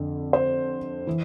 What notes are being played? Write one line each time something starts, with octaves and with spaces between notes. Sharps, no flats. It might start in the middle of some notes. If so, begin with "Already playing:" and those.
Already playing: F2 D3
C5
E3